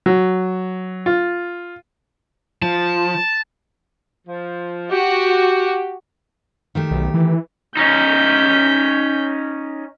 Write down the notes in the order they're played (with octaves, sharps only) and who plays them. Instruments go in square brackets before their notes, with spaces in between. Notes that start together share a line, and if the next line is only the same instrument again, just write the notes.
[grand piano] F#3
F4
[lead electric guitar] F3 [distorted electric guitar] A5
[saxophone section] F3
[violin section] F#4 [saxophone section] G4
[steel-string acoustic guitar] D#3 A3 G4
[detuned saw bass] B1
E3
[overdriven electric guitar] C#4 D#4 [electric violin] G6 B6